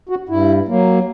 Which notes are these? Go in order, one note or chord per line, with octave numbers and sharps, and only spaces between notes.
F#4
G2 E4
F#3 A#3